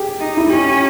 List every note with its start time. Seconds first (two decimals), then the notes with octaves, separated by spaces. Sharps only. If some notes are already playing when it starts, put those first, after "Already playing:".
Already playing: G4 G#4
0.19 D#4
0.37 E4
0.49 C#4 G4